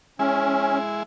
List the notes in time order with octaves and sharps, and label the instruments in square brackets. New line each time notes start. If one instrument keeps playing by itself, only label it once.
[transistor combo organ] G#3 E4 [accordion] C#4